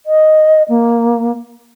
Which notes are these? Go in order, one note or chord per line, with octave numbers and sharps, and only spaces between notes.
D#5
A#3